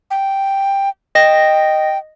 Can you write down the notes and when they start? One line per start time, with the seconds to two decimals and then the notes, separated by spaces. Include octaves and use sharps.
0.11 G5
1.15 D#5 G5 A#6